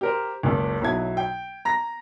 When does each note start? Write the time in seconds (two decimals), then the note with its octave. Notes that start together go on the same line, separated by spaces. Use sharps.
0.01 G4 A#4 C5
0.43 F#1 C#2
0.81 B1 F#3 E4 G#6
1.17 G5
1.65 A#5 A#6